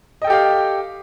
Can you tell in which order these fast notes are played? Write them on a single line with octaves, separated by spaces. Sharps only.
D#5 G5 A4 G4 F5